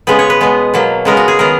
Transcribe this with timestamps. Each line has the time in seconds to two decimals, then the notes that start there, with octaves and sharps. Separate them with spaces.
0.07 C#3 G#3 B3 B4
0.19 C#5
0.30 B4
0.41 B2 G#3 B3
0.74 B2 F#3 A#3
1.05 C#3 G#3 B3 A#4
1.17 F#4
1.28 G#4
1.39 D#3 F#3 B3 A#4